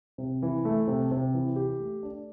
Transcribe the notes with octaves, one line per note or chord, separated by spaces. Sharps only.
C3
E3
A3
C3
C3
E3
G4
A3
D4